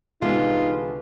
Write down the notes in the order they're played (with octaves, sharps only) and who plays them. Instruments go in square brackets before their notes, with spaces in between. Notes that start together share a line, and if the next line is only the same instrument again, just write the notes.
[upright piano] C2 B3 [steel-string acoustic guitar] D3 E3 G#3 [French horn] D#4 [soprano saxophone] F4